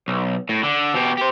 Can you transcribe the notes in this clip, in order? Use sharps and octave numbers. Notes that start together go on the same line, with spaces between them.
B1
A2
D3
B2 G4
G4 C5